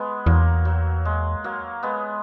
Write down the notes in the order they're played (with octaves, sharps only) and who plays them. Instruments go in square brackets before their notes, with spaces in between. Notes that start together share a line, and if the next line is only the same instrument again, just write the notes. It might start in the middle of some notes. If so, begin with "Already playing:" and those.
Already playing: [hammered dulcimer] G#3 B3
[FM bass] E2 [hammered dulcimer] F#3 A#3
[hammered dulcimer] F#3
G#3
F#3 A#3
G#3 B3